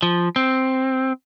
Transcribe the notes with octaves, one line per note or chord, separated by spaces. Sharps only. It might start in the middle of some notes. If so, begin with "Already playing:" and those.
F3
C4